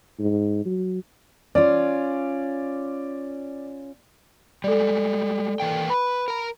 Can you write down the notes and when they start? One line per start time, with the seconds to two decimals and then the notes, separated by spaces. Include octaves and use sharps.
0.19 G#2
0.66 F#3
1.55 C#4 F4 D5
4.64 G3 G#3 A4 D5
5.60 E3 A#3 G5
5.90 B4 B5
6.28 A#4 A#5